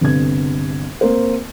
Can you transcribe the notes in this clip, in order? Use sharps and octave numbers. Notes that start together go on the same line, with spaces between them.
G1 C3 G#6
A#3 C4 A#4 C5